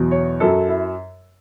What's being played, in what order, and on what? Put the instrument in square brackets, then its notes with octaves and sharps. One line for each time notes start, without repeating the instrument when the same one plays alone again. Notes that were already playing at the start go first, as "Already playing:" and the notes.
Already playing: [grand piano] E2 B2 F#3
C#5
F#2 F#3 A4
E4